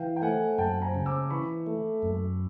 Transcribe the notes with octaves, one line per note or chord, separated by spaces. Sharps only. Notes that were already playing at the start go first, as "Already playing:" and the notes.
Already playing: E3 F5 G5
G5
A3 F#5 G#5
F#2 G5 A5
G#5 A#5
C#3
D6 E6
E3 B5 C#6
A3
F#2